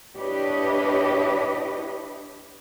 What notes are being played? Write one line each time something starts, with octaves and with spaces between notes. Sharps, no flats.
D4 E4 G4 B4 C#5 D#5